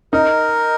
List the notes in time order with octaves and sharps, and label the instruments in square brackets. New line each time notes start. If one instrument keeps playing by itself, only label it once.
[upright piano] D#4 [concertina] A#4